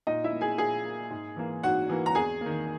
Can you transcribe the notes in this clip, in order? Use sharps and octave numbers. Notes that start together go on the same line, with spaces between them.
A#2 D#4 D#5
E4 E5
A#3
G#4 G#5
A#2 G#4 G#5
A#3
G#2
E3 A#3
G#2 F#4 F#5
E3 A#3
A#5
E2 G#4 G#5
D#3 A#3